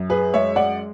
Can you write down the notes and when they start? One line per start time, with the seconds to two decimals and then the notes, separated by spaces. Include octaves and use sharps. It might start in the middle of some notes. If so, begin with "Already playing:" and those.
Already playing: F#2
0.10 G#4 B4
0.34 G#3 C#5 E5
0.56 D5 F#5